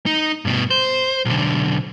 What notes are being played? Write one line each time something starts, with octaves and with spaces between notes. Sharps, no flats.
D#4
G2 B2
C5
B1 D3